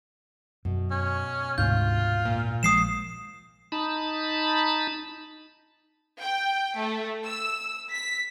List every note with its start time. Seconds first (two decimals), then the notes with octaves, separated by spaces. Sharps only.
0.65 F#2 B2
0.91 C#4
1.58 D2 G#2 C3 F4 G6
2.25 A#2
2.63 A#1 F3 G#3 D#6 C7 E7
3.72 D#4 A5 B5
6.22 G5
6.76 A3
7.25 E6
7.92 B6